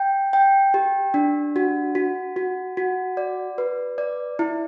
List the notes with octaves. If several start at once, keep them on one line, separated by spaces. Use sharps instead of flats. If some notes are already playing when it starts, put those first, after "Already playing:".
Already playing: G5
G5
G4
D4
F#4
F#4
F#4
F#4
D5
B4
D5
E4